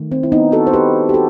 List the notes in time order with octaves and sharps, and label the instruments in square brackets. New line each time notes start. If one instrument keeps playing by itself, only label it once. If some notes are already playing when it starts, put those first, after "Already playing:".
Already playing: [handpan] D#3 A3
C4
E4
B3 D#4
F#4 A4
C5
G4 B4
G4
F#4 A4